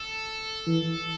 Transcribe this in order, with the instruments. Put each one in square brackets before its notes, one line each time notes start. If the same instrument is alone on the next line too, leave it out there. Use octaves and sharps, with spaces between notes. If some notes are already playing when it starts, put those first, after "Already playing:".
Already playing: [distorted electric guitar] A4
[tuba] E3